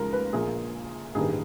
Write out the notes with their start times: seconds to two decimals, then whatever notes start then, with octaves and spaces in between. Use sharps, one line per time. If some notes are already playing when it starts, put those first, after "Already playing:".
Already playing: D#2 C#3 F3 G#3 A#4
0.13 B4
0.33 A#1 A#2 F3 A#3 G#4
1.15 A1 G2 D#3 G3 A#3 G#4